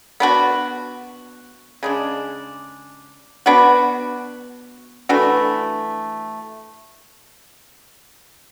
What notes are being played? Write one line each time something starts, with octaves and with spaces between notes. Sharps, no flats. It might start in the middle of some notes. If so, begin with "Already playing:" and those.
B3 D4 F#4
C#3 G#3 D4
B3 D4 F#4
E3 A3 D4 F#4